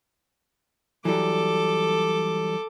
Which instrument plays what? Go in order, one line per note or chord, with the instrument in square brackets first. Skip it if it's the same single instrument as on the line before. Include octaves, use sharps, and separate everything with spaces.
[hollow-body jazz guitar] E3 F#3 G3 [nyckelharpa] A4 D6